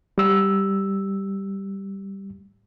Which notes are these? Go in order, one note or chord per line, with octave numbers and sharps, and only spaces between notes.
G3 E6